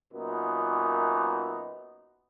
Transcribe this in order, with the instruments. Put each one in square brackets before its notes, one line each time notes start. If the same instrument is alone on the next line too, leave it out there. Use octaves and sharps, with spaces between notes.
[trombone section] F#2 A#2 B3 D#4